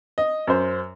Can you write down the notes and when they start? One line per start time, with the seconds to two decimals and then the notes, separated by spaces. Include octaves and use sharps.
0.18 D#5
0.47 F#2 C5